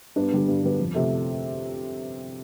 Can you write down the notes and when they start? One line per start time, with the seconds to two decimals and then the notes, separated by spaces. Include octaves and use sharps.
0.16 G2 B3 D4
0.32 D3 G3 B3
0.48 G2
0.63 D3 G3 B3
0.79 F2
0.94 C3 F3 A3